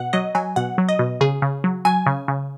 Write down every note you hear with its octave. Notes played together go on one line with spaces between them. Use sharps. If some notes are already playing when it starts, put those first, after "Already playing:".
Already playing: B2 F#5
F#3 D#5
F#3 G#5
B2 F#5
F#3
D#5
B2
C#3 G#4
C#3
F#3
F#3 G#5
C#3
C#3